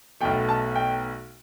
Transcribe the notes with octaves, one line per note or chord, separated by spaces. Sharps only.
B1 B2 A3 G5
A5
G5